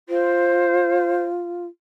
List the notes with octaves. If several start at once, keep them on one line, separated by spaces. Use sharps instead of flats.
F4 C5